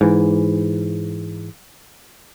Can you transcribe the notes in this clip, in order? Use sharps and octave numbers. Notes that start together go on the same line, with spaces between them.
G#2 E3